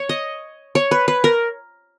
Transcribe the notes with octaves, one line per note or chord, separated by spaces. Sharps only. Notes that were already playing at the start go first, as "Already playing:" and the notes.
Already playing: C#5
D#5
C#5
B4
B4
A#4